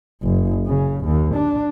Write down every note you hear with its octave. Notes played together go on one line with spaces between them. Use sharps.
F#1
C#3
D#2
D4